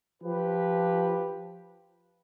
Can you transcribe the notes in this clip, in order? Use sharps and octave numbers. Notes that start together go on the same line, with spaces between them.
F3 G4 B4